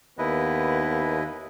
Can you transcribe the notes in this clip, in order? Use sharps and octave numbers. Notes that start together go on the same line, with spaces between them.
D#2 B3 E4 B4 D#5